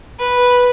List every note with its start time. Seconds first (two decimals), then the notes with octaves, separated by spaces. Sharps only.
0.19 B4